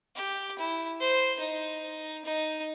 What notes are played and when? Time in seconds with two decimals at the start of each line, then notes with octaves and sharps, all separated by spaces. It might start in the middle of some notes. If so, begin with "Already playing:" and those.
0.16 G4
0.58 E4
1.00 C5
1.40 D#4
2.25 D#4